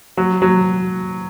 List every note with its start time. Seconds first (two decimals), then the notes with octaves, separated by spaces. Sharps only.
0.17 F#3
0.42 F#3